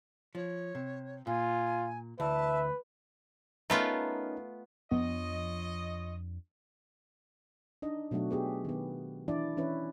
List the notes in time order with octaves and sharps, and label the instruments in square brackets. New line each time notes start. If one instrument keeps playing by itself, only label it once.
[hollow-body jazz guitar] F3 [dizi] C#5
[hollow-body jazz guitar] C3
[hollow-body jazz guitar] A#2 [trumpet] F4 [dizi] G#5
[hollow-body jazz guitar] D2 E3 [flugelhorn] B4 [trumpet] E5 [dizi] A5
[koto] A3 B3 F4 [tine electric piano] C#4 D#4 A#4
[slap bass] F2 F3 D4 [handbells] B3 [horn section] F4 C#5 D#5
[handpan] D4 D#4 D#5
B2 F#3 A3 D4 F#4
B3 G4 G#4
D#3 B3
E3 D4 E4 D5
E3 C#4 E4 B4 C#5